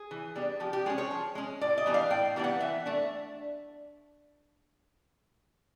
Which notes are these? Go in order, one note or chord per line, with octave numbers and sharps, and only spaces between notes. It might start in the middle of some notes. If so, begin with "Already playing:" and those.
Already playing: G#4
E3
G3 B3 D4
F3 G4
G4
G#3 C#4 G#4
C#5
F3
G#3 C#4
A2 D5
D#5
E3 G3 B3 D4
F5
A2 G5
E3 G3 B3 D4
F#5
E3 E5
A3 D4